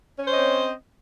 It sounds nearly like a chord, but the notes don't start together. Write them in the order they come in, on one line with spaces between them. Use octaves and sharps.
C#4 C#5 C5 D#5 C4